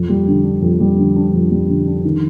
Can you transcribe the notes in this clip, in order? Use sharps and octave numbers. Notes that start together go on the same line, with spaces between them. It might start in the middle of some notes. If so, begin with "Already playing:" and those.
Already playing: F2
G3
D3
D4
F2
G3
D3
D4
F2
G3
D3
D4
D#3